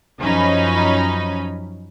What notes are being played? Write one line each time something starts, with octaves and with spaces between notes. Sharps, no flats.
F#2 F3 C#4 D#4 B5